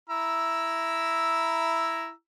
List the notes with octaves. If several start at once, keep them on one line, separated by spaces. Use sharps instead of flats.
E4 A#5 E6